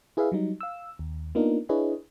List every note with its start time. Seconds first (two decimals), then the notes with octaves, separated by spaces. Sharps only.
0.17 E4 G#4 B4 E5 F5
0.32 F#3 G3 D#4
0.61 F5 E6
0.99 D#2
1.35 A#3 B3 D4 D#4 F4 A#4
1.69 D4 E4 G#4 B4 C#5 D#5